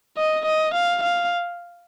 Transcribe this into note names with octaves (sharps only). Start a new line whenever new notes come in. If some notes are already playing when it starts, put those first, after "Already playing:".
D#5
D#5
F5
F5